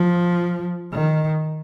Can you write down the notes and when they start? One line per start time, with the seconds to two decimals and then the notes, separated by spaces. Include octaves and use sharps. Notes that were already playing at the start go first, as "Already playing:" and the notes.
Already playing: F3
0.92 D#3